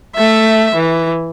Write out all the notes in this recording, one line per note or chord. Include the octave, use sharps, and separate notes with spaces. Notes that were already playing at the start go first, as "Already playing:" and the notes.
A3 E5
E3